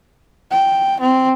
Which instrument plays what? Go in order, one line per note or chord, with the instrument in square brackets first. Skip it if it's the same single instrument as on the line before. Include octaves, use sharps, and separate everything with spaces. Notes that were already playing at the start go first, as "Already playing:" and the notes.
[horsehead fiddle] G5
C4